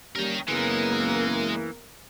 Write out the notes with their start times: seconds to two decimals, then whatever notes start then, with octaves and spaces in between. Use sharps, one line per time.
0.16 G3 A#3 C#4 A#4 G5
0.48 F#2 C#3 E3 G#3 A#3 B3 A#4